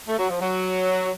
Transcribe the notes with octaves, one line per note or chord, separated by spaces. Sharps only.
A3
F#3
F3
F#3